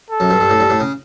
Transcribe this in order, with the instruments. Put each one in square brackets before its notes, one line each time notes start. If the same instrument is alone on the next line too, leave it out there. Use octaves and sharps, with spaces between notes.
[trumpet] A4
[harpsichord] F#2
G2
G2
A2
G2
A2
C#3